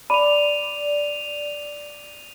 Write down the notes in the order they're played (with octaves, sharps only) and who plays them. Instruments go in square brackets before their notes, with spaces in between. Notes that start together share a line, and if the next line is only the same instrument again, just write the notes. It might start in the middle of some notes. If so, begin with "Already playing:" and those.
[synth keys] D5 [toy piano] B5 [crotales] D#7 F7